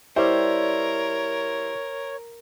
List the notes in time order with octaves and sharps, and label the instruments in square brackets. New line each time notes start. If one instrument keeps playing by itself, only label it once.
[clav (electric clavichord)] G3 [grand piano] E4 C5 [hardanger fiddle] A#4 [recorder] C#5